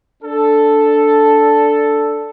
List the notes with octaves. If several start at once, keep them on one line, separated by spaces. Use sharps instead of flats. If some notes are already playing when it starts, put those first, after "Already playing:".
D4 A4